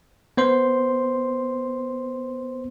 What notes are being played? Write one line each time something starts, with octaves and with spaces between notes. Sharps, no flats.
B3 C5 C6